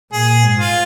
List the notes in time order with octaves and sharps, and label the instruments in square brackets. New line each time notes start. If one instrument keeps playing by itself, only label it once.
[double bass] A#2 [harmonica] G#4
[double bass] G#2
[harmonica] F4